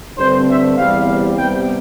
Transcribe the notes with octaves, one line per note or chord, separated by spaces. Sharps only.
G2 D3 A3 C4 C5
E5
E2 C3 G3 B3 F5
C3 G3 B3 G5